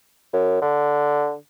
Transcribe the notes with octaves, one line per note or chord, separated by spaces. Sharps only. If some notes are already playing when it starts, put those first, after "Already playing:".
F#2
D3